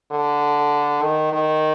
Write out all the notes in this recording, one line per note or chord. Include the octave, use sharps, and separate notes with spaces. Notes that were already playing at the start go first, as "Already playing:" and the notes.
D3
D#3
D#3